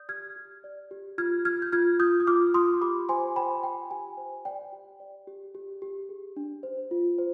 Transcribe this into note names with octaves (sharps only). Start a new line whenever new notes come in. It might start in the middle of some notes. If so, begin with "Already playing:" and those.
Already playing: D5 D#6 G6
G4 F6 G#6
G4
D5
G4
F4 F6 G#6
F4 F6 G#6
G6
F4 F6 G#6
F4 D#6 G6
D#6
F4 D6 F6
F4 C6 D#6
G4 B5 D6
C5 G#5 C6
C5 G5 B5
C5 G5
G4 G#5
C5
D5 G5
G4
D5
G4
G4
G4
G#4
D4
C5
F4
C5